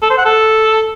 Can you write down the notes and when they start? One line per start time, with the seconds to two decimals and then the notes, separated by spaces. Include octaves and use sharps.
0.02 A4
0.10 C5
0.18 F#5
0.25 A4